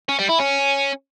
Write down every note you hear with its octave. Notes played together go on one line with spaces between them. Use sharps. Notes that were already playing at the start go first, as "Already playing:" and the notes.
C#4
G3
E4
C#4